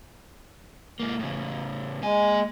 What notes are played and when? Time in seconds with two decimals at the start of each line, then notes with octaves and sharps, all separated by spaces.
1.00 G#2 A#3
1.19 A2 C#3
2.02 G#3 A#3 G#5